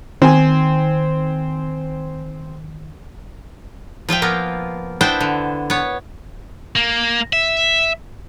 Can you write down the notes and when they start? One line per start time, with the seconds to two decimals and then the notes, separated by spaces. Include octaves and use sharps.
0.22 D#3 C4 G#5
4.09 F3 F4 E5 G5
4.22 F3 A#3 B3
5.01 B3 D4 E4 C5 G5
5.20 D3
5.70 B3 C#5
6.76 A#3
7.33 E5